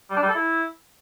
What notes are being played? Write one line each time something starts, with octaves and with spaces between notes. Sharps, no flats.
G3
D4
G3
A4
E4